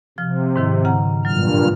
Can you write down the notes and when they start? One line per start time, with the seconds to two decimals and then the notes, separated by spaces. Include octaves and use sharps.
0.18 C3 F3 F6
0.56 G#2 D#3 E4
0.85 C#3 F#5 A#5
1.25 G2 A#2 F#3 F6